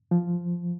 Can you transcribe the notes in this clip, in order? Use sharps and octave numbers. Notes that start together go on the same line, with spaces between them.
F3